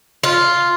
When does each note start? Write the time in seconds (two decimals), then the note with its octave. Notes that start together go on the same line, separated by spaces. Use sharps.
0.24 F4